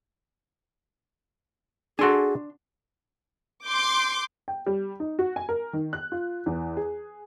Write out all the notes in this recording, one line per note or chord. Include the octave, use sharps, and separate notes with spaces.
D4 F#4 G#4 A4 G#5 C6
C6 D6 G6
G5
G3
D#4
F#4
G#5
A#4
D#3
F#6
F4
E2
G#4